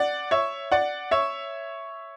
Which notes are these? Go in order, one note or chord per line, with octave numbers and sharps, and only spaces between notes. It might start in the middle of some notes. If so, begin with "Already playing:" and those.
Already playing: D5 F#5
C#5 E5
D5 F#5
C#5 E5